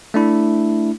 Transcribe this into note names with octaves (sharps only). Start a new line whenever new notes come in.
A3 D4 E4